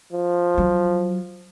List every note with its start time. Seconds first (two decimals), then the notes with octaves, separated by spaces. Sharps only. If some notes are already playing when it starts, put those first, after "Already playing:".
0.13 F3
0.58 F#3